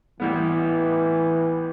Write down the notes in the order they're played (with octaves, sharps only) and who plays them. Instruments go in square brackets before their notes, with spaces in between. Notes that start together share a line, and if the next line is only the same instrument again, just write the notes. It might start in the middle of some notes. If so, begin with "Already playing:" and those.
[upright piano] A1 A2 G3 B3 [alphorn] E3